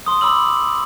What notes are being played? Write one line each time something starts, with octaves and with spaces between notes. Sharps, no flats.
C6 D#6
B5 D6 E6 F#7